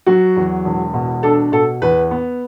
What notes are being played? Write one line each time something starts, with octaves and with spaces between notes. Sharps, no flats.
F#3 F#4
E2
E1
B2
D4 A4
B2 A4
E2 B4
B3